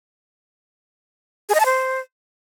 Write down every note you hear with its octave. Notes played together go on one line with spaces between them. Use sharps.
G#4
D#5
A5
C5